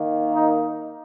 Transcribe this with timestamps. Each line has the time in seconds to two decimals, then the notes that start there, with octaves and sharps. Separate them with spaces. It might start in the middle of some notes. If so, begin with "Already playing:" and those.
Already playing: D#3 A#3
0.34 D#4